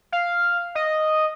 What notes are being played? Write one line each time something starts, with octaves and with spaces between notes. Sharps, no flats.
F5
D#5